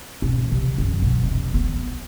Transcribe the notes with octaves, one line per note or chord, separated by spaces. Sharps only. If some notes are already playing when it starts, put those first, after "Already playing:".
E2 B2
C3
F#2
B2 F#3
F1
B3